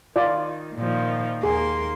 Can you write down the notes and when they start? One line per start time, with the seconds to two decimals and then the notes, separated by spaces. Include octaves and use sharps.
0.16 D#3 F4 D5
0.75 A#2 D#3 F3
1.43 D#2 A#3 G#4 C6